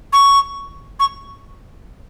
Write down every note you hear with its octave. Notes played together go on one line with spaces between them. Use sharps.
C#6
C#6